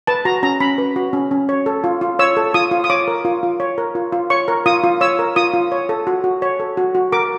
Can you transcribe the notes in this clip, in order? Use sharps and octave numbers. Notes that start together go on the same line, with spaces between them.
B4 A5
F#4 A#5
C#4 A#5
C#4 B5
B4
F#4
C#4
C#4
C#5
A4
F4
F4
C#5 E6
A4
F4 D#6
F4
D#6
C#5 D6
A#4
F4
F4
C#5
A#4
F4
F4
C#5 C#6
A#4
F4 D#6
F4
C#5 E6
A#4
F4 D#6
F4
C#5
A4
F#4
F#4
C#5
A4
F#4
F#4
A#4 D6